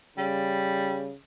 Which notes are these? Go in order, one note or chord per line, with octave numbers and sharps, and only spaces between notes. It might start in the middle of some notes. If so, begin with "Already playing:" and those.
C#3 G3